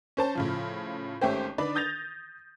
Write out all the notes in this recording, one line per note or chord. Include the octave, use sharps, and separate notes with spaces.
C#4 C5 A5
A2 C#3 F3
G#1 A3 C#4 G4 C5
D3 D4 D#4 B4 D5
D#6 G6 A6 A#6 F7